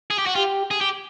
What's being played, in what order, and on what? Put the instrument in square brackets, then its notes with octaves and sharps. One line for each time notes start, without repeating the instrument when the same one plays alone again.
[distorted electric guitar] G#4
G4
F#4
[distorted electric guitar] F4 [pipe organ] G4
[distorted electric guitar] G#4
G4